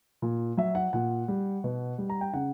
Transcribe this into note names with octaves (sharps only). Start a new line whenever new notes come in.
A#2
F#3 E5
F#5
A#2 F#5
G3
B2
G3
A#5
G5
C#3 F#5